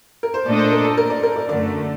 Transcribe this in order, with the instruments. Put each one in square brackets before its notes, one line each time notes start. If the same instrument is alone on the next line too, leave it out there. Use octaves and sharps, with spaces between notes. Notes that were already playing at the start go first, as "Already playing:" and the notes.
[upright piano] A#4
C5
[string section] A#2 A3 D4 A4 D#5 [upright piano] D5
[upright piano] C5
A#4
A4
A#4
D5
A#4
D5
[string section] F#2 D3 A3 [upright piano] D5